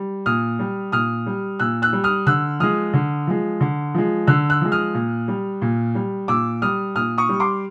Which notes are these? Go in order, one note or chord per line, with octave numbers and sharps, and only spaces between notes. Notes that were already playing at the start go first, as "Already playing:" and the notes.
Already playing: G3
A#2 D#6 F6
G3
A#2 D#6 F6
G3
A#2 E6 F#6
E6 F#6
G3
D#6 F6
D3 E6 F#6
F3 G#3 D#6 F6
D3
F3 G#3
D3
F3 G#3
D3 E6 F#6
E6 F#6
F3 G#3
D#6 F6
A#2
G3
A#2
G3
A#2 D6 E6
G3 D#6 F6
A#2 D#6 F6
C#6 D#6
G3
C6 D6